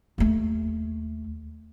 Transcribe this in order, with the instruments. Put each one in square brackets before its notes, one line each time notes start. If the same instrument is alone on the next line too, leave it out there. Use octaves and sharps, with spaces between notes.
[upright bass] D#2 A3